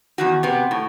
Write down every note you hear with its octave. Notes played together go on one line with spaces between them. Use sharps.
E2 D#3 F#4
C3 B3
A2